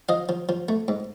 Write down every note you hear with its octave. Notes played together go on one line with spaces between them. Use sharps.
F3 D#5 F5
F3
F3
A3
G#2